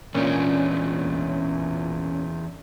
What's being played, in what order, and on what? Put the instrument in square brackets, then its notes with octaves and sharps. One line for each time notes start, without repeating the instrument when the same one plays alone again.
[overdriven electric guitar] E2 D4 [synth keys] A#2 C#4
[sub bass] A1